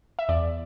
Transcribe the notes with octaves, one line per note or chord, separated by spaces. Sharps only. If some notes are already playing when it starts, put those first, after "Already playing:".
E5
E2 D5